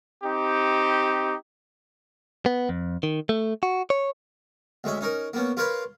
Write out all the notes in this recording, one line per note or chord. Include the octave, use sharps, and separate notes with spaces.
C4 D#4 G4
B3
F2
D#3
A3
F#4
C#5
D2 G#3 C#4 E5
C#4 D#4 A#4
A#3 B3 C#4
F4 A#4 B4 C#5 F5 B5